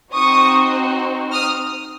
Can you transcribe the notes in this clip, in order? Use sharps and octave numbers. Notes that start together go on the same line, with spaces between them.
C4 D#4 F#4 C#6 D#6
D#6 F6